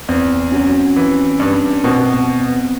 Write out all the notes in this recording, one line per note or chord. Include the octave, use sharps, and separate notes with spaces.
E2 C4
F#3 C#4
E3
G2
B2 C4
B3